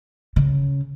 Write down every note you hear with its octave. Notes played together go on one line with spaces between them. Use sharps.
C#3